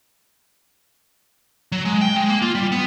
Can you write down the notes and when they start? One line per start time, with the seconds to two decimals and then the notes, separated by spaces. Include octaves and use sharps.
1.72 F#3
1.85 G#3
2.01 G5
2.16 G#3
2.29 A#3
2.42 F4
2.55 G3
2.72 B3